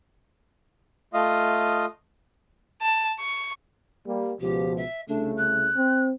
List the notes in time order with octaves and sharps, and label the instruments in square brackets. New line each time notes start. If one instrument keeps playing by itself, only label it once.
[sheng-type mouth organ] A3 F4 D#5 F5 D#6
[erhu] A5
C#6
[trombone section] G3 A#3
[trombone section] C#2 B2 F3 [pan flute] G4
[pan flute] E5
[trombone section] C2 C#3 A3 [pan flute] D4
[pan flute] F#6
[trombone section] C4